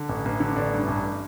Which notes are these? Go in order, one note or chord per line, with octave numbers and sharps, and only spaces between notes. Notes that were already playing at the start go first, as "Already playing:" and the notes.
Already playing: D3
A1
A1
D3
A1 D5
G2
A1